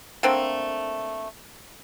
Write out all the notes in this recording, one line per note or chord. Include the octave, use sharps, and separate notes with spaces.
D3 A3 A#3 C4